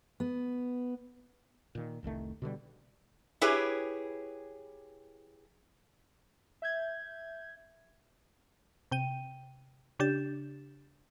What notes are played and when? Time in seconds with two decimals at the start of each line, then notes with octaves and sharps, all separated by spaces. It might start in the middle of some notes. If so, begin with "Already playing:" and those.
0.20 B3
1.75 A#2 D#3
2.03 F1 C2 D#3 A3
2.42 B2 D3 E3 G3
3.41 E4 G4 G#4 B4 C#5
6.62 E5 G6 G#6
8.91 C3 G5 D#7
9.99 C#3 D4 G4 G6 A6 E7